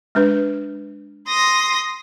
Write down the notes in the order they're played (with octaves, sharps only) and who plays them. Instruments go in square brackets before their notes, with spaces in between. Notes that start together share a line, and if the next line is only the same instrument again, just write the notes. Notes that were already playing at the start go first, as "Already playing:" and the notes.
[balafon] G#3 D4 B4
[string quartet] C6 D#6 A#6